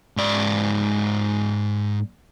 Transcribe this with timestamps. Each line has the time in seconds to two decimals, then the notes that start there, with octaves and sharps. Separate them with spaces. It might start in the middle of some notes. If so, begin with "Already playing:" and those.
0.17 G#2 D5